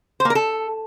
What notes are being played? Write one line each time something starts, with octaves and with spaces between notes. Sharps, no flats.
C5
A#3
A#4
A4